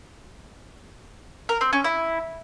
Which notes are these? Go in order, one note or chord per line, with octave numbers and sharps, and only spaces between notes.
A#4
C4
C#4
E4